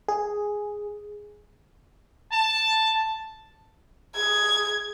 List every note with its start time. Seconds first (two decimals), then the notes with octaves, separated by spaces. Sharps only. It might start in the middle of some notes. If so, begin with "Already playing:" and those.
0.09 G#4
2.32 A5
4.16 G#4 G#6